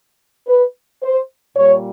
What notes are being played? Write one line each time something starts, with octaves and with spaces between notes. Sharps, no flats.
B4
C5
A#2 G3 A#3 C#5